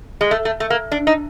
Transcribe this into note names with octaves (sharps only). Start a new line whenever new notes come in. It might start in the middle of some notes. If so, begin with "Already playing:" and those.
G#3
A3
A3
A3
A#3
D4
D#4